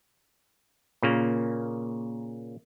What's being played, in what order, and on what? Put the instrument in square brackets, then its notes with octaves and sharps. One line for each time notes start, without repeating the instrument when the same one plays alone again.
[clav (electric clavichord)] A#2 C#3 A#3